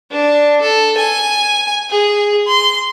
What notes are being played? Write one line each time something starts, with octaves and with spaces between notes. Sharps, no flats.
D4
A4
G#5
G#4
C6